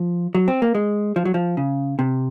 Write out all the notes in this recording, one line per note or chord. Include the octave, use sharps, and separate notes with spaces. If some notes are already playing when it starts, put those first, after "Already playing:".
Already playing: F3
F#3
C4
A#3
G#3
F3
F#3
F3
C#3
C3